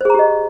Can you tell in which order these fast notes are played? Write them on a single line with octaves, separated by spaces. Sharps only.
C5 G#4 A#5 G4 D#5